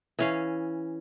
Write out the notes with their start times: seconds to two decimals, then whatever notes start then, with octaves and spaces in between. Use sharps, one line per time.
0.19 E3 C#4 F5